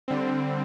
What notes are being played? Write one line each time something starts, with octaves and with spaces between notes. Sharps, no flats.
D3 G3 C4